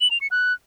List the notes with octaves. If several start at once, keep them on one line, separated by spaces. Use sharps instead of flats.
F#7
F7
C#7
F#6